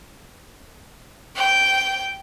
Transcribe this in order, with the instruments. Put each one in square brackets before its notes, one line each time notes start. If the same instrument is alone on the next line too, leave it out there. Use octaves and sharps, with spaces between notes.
[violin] G5